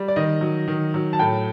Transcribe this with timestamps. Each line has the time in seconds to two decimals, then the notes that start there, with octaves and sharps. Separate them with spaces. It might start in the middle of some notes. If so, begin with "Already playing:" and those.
Already playing: G3
0.08 D5
0.16 D#3 D#5
0.41 F#3
0.68 D#3
0.94 F#3
1.13 A5
1.19 A2 G5